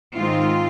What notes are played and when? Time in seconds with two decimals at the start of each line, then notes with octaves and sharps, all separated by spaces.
0.15 G#2 D#3 G#3 C4 D#4 F4